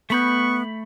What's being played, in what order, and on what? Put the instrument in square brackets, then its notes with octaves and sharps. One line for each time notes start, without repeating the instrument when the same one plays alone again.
[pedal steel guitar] A3 B5 G6 [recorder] B3 [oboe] C#6